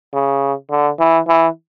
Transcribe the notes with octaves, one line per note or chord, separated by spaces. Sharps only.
C#3
D3
E3
E3